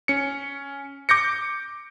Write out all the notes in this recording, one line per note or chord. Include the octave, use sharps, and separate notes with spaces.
C#4 C#7
D6 G6 A#6 C#7